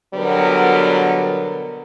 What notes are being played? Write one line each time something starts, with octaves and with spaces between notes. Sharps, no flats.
B2 D3 F#3 G3 B3 A#4